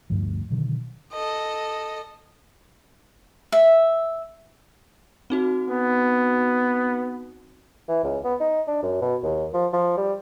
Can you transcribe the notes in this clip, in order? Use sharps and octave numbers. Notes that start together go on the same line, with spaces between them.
D2 G2 F3
B2 D3 D#3 F#3
A4 D#5
E5
C4 D#4 F#4
B3
E3
C#2
B3
D#4
D4
F#2
B2
D#2
F3
F3
G3